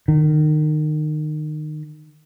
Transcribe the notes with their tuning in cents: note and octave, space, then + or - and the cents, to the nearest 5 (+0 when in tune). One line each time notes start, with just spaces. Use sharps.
D#3 -30